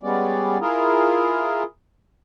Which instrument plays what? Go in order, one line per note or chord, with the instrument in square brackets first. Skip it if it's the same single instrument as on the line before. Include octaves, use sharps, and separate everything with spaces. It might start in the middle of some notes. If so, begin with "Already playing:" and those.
[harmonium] G3 G#3 B3 C#4 D5
E4 F4 G#4 A#4